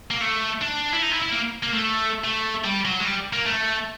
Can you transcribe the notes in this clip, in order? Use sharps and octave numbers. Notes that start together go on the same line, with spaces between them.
A#3
A3
D4
E4
D#4
E4
E4
A#3
A#3
A3
A3
G3
F#3
G#3
G3
A#3
A3